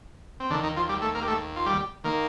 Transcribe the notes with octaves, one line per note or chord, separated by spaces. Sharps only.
C4
D#2 D3 D#3 D4
D#3 D#4
F3 F4
G3 G4
A3 A4
A#3 A#4
G4
A3 A4
F4
G3 G4
D#3 A#3